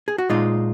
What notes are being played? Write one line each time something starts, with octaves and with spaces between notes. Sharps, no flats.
G#4
F#4
A#2 G#3 D#4 F4